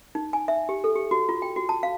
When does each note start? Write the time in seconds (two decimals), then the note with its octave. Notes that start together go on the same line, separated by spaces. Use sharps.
0.15 D#4
0.33 G#5
0.48 E5
0.69 G4
0.84 A4
0.96 G4
1.11 F#4
1.29 F4
1.42 G5
1.56 F#4
1.69 A5
1.83 F5